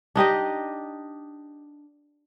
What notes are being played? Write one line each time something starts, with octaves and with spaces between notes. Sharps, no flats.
D4 D#4 G4 D#5